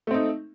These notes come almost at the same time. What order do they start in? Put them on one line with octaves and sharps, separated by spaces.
A3 C4 D#4